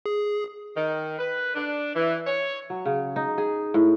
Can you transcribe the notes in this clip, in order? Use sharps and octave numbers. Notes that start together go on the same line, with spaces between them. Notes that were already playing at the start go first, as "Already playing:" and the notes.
G#4
D#3
B4
D4
E3
C#5
F#3
C#3
D#4
G#4
A2